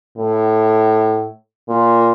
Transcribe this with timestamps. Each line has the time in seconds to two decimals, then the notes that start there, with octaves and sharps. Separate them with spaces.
0.18 A2
1.69 A#2